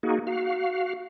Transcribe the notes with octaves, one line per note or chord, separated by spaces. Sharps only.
A#3 D#4 F#4 G#4
F#4 F5